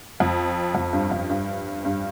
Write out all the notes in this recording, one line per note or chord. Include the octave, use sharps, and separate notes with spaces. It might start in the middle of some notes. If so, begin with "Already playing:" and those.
F2
F2
G2
F2
G2
G2